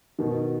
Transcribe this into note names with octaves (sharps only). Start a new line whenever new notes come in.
B2 D#3